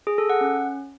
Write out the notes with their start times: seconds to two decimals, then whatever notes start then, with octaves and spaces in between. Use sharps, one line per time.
0.07 G#4
0.18 A4
0.30 F#5
0.41 C#4